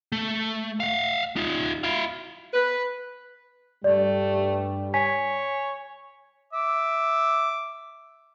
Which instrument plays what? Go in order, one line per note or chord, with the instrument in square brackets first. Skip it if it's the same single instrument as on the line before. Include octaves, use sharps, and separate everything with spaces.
[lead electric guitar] A3
F5 F#5
D#4 F4
E4 F5
[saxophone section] B4
[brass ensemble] G2 G3 [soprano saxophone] A3 [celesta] D5
[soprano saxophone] C#5 [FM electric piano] G#5 [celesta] B6
[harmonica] E5 D6